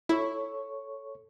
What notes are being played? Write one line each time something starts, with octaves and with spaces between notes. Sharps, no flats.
E4 A4 C#5 C#6